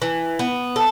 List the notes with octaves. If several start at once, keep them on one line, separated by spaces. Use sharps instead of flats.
E3
B3
A4